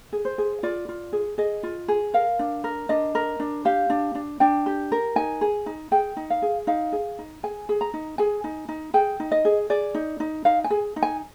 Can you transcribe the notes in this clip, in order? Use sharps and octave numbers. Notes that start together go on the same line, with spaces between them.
G#4
C5
G#4
F4 D5
F4
G#4
G#4 D#5
F4
G#4
A#4 F5
D4
A#4
D4 D#5
A#4
D4
G4 F5
D4
D4
D4 G5
G4
A#4
D#4 G#5
G#4
D#4
G#4 G5
D#4
F5
G#4
D#4 F5
G#4
D#4
G#4 G#5
G#4
A#5
D#4
G#4 G#5
D#4
D#4
G#4 G5
D#4
D#5
G#4
G#4 D5
D#4
D#4
D#4 F5
G#5
G#4
D#4
G#5